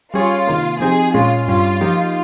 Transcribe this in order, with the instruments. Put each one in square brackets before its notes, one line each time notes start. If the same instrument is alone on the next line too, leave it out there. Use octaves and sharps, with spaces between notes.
[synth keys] G3 C#4 G#4 C#5 [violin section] F4
[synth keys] C3 D#3 A#3
[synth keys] F3 C4 D#4 G4 [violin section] G#4
[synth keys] A#2 G#3 C#4 [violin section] F4
[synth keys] G2 G3 C#4 [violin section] F4
[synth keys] F3 A#3 D#4 G4 [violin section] F4